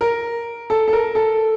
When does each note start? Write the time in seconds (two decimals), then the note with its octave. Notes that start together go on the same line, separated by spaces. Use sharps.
0.01 A#4
0.70 A4
0.88 A4
0.93 A#4
1.15 A4